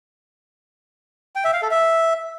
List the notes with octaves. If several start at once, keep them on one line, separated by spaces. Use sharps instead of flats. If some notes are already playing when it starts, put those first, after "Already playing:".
G5
E5
F5
A4
E5